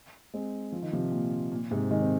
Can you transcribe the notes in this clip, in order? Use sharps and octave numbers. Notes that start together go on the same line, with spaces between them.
G#3 C4
F3
D#3
C3 F3
A#2
A#2
G#2 C3
D#3 G#3
C4